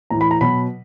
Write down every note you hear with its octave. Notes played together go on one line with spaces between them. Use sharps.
A2 E3 A#5
B5
A#5
B2 F#3 B5